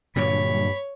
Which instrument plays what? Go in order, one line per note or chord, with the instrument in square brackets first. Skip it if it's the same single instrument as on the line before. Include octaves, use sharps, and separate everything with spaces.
[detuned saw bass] G2 [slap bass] A#2 D3 F#3 [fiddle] C#5 [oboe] B5